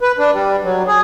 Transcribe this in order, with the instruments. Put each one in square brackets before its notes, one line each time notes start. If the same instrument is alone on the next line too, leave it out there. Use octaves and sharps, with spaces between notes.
[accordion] B4
D4
G3
F#3
G#4